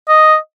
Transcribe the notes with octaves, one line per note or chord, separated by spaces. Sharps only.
D#5